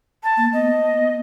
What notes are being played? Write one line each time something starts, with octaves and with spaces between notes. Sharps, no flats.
A5
A#3
B3 D#5